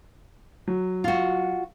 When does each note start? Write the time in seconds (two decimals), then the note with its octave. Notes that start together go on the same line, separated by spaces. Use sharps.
0.68 F#3
1.04 F4 F#4